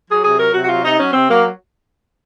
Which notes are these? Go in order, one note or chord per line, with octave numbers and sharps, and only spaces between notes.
F#3 G#4
C3 G#4
F#3 A#4
C3 F#4
F#4
F#3 F4
C3 D#4
F#3 C#4
C3 C4
F#3 A#3